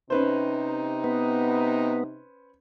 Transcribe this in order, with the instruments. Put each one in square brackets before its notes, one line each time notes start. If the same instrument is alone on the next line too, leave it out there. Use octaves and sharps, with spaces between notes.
[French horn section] C3 D#4 [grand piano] C#4 B4 C5
[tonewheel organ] B3